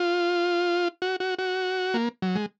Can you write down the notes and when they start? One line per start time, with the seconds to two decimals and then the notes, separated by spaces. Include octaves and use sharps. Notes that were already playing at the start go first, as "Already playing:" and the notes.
Already playing: F4
1.02 F#4
1.20 F#4
1.39 F#4
1.94 A#3
2.22 F#3
2.35 G#3